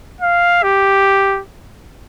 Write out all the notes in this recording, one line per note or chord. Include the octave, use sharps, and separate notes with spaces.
F5
G4